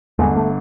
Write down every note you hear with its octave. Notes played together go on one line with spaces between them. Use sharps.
G1 G2 D3 G#3
A3